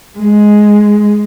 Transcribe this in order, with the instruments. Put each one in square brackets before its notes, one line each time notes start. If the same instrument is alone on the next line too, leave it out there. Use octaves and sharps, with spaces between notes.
[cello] G#3